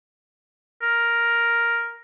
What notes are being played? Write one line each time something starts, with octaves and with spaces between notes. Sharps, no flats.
A#4